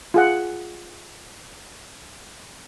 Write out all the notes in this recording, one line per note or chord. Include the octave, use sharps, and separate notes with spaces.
F4 G#4 F#5